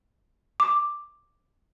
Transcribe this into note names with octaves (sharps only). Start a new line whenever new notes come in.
D6